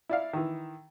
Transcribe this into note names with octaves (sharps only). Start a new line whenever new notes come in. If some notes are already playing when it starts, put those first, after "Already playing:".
E4 D5 F5
D#3 E3